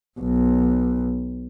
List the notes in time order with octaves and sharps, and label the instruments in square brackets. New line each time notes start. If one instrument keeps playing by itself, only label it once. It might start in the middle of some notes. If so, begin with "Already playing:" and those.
[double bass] B1